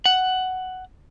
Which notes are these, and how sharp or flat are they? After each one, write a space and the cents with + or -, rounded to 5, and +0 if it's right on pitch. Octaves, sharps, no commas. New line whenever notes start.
F#5 +10